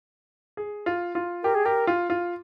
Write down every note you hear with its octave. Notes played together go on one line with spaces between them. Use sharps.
G#4
F4
F4
G4 A#4
G#4
G4 A#4
F4
F4